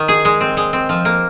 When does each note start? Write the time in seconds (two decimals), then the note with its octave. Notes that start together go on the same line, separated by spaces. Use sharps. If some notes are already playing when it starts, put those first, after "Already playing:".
Already playing: D#3
0.08 G#4
0.25 G#3
0.41 C4
0.57 G#3
0.73 C4
0.89 F3
1.05 A#3